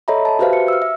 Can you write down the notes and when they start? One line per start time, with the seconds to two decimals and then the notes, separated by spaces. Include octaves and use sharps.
0.08 A4 C#5 D#5 E5 A#5 B5
0.25 E5 A5
0.39 F#4 G4 B4 C5 E5 F5
0.53 C#7
0.68 E6 F6
0.82 E5